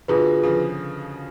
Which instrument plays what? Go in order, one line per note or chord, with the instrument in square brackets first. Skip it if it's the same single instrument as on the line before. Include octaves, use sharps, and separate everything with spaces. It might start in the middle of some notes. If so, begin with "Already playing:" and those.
[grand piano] B2 D3 [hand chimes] F4 G#4 B4
[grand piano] C#3 F3